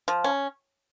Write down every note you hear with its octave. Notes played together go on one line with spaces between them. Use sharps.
F3
C#4